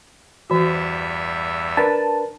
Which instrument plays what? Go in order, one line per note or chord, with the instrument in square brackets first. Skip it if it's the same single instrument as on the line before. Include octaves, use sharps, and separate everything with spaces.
[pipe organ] E2 G2 E5 [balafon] E3 F#4
[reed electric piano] D4 A#4 B4 [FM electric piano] A5